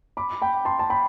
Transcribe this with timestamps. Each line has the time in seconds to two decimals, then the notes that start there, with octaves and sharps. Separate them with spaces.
0.17 B5 D6
0.42 G5 B5
0.65 A5 C6
0.79 A5
0.90 G5 B5